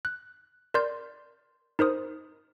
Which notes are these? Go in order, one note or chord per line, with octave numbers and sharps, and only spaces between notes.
F#6
A#4 D5 C6 G6
D#4 A#4 C5 D#6